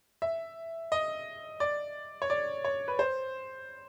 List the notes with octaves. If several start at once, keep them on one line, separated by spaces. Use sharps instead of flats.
E5
D#5
D5
C#5
D5
C#5
B4
C5